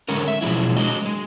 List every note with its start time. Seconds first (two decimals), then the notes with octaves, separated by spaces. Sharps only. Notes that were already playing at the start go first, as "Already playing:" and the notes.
0.09 D3 G#3 A3 C#4 A#4
0.28 E5
0.41 B2 F3 F#3 G#3 E4
0.77 G#3 D4 F#4 D#5
1.05 G#3